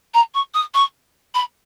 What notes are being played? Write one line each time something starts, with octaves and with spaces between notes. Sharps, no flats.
A#5
C#6
D#6
C#6
B5